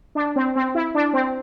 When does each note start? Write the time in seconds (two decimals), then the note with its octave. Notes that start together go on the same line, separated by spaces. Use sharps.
0.15 D4
0.36 C4
0.56 C4
0.75 E4
0.95 D4
1.13 C4